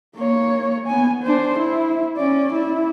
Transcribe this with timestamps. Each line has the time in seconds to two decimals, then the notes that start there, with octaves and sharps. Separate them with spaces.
0.16 A#3 C#5
0.87 B3 G#5
1.23 D4 C5
1.58 E4
2.17 C#4 D5
2.53 E4